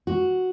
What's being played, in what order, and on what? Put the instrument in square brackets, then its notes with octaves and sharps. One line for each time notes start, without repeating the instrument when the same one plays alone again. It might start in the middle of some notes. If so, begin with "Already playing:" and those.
[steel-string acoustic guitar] F#4